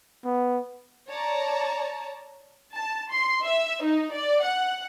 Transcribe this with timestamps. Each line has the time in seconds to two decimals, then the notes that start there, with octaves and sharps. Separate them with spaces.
0.25 B3
1.09 C#5 D5 A5 A#5
2.75 A5
3.11 C6
3.44 E5
3.84 D#4
4.14 D5
4.43 F#5